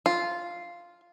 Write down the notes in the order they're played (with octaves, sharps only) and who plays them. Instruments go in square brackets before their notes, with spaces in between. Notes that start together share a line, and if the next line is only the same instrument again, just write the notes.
[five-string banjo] F4